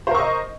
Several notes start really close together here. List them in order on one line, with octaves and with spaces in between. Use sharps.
C5 A#4 C#6 D#5